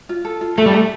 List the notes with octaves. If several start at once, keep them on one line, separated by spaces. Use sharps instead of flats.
F4
A4
F4
A3 A4
G3
A3 A5